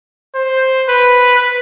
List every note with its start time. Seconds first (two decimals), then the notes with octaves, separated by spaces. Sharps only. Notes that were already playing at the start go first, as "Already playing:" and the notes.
0.35 C5
0.89 B4